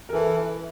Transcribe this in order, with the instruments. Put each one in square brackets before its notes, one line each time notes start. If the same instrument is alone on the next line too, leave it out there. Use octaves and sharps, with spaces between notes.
[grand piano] A#4
[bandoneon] E3 [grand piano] A4